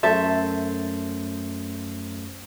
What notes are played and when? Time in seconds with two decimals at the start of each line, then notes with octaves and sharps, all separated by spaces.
0.03 F#2 A3 A4 C5 E5